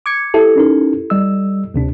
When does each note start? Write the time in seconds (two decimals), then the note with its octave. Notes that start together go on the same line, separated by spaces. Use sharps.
0.06 D6 G#6 C#7
0.34 E4 G4 A4
0.56 C#4 D#4 A#4
1.10 G3 D#5 E6
1.74 D2 C3 D4